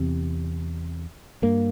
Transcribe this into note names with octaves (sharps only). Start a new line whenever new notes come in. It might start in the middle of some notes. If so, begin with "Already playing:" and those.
Already playing: E2 C3 C4
G2 A#3